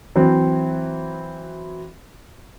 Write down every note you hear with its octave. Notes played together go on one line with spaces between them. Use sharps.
E3 F#3 C4